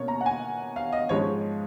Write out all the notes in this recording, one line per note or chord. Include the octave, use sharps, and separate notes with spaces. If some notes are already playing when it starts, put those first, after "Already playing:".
Already playing: B2 A#3 C#4 C#5
A#5
F#5
G#5
F5
D#5
G#2 F3 G#3 C#4 C#5